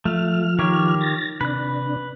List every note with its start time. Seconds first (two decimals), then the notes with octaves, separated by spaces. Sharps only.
0.05 F3 A3 F6
0.59 D#3 G4 C#5
1.01 A6 A#6
1.41 C3 D4 B4 F#6